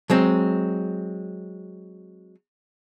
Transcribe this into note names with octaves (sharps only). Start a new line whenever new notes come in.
F#3 G#3 C4